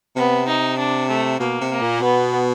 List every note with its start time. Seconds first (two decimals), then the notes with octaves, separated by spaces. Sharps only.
0.16 C3 B3
0.47 D#4
0.78 D4
1.09 A3
1.40 B2 A#3
1.61 C3
1.71 A#3
1.81 A#2
2.02 B2 B3